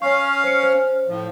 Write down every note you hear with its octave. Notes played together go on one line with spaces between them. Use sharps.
C#4 C#5 F5 C#6
C5 C#7
C5
A2 F3